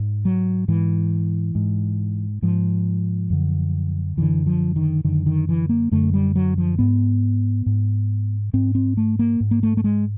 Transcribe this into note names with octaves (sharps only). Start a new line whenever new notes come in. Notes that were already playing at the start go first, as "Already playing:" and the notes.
Already playing: G#2
F#3
G#2 E3
G#2
G#2 F3
F#2 D3
F#2 D3 E3
F3
D#3
F#2 D3 D#3
D#3
E3
A#3
F#2 D3 A3
G3
F#3
F3
G#2 B3
G#2
G#2 C4
C4
A3
A#3
G#2
A#3
A3
A3
G#3